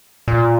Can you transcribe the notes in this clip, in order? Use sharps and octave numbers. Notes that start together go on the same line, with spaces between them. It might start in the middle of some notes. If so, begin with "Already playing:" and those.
A#2